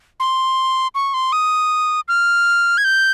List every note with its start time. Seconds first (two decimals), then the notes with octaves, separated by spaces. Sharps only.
0.20 C6
0.95 C#6
1.14 C6
1.32 D#6
2.08 F6
2.78 G#6
2.84 G6